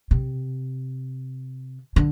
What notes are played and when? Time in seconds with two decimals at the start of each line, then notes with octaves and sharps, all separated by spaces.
0.11 C3
1.96 D3